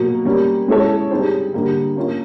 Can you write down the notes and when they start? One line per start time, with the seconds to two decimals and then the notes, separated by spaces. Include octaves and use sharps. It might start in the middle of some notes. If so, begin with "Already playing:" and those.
Already playing: B2 F#3 A#3
0.25 G3 A#3 C#4
0.68 G#3 C#4 E4 A4 C#5
1.11 G3 C4 D#4 G#4 C5
1.54 D3 G3 A#3
1.96 A#3 C#4 F4